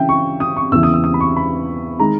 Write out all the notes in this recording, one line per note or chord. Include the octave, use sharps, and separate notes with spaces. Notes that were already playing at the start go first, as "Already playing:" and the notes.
Already playing: C#3 E3 E5 G5
C#6
D#6
C#6
E2 C#3 E3 E6
D#6
E6
D#6
B5
C#6
B5
D#3 G#3 A#5